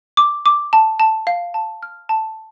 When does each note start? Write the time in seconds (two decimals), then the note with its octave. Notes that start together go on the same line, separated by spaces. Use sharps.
0.17 D6
0.46 D6
0.73 A5
1.00 A5
1.27 F5
1.54 A5
1.83 F6
2.09 A5